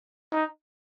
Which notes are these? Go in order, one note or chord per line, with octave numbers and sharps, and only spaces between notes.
D#4